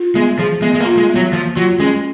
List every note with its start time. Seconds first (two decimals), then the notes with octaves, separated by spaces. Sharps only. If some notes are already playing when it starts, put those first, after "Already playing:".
Already playing: F4
0.15 G#3 B3
0.39 F3 G#4
0.62 G#3 B3
0.74 G#3
0.80 A#3
0.85 F4
0.97 G#3
1.10 B3
1.15 F#3
1.33 F3 A#3
1.56 F#3 F4
1.79 G#3 C#4